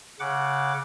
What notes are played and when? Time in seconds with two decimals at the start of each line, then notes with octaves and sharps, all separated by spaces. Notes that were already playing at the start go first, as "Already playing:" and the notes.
0.19 C#3 F#5 D6